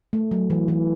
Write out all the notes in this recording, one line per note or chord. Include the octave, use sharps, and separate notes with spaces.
A3
F#3
E3
E3